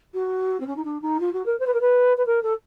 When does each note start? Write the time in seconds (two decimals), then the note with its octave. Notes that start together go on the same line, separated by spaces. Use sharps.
0.14 F#4
0.60 C4
0.66 C#4
0.76 D#4
0.84 D4
1.01 D#4
1.20 F4
1.33 F#4
1.45 A#4
1.59 C5
1.66 B4
1.73 A#4
1.80 B4
2.17 B4
2.26 A#4
2.42 A4